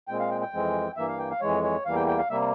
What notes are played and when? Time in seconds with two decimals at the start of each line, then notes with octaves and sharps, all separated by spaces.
0.08 A#2 G#3 C4 G5
0.20 F5
0.31 G5
0.42 G5
0.53 F2 E3 G#3 C4
0.97 G2 E3 A#3 E5
1.08 F5
1.19 G5
1.31 F5
1.41 F2 E3 G#3 C#5
1.64 C#5
1.86 E2 E3 G3 A#3 F5
1.96 G5
2.08 G5
2.18 F5
2.30 C3 G3 A#3 E5